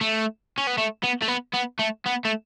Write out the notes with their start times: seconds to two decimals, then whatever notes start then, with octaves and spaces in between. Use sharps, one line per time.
0.01 A3
0.58 C#4
0.67 B3
0.78 A3
1.03 B3
1.22 A3
1.28 B3
1.54 B3
1.79 A3
2.06 B3
2.25 A3